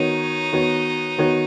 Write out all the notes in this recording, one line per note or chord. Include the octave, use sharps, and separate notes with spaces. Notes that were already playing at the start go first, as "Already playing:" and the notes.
Already playing: D#3 B3 D#4 F#4 C#5
D#3 B3 F#4 C#5
D#3 B3 F#4 C#5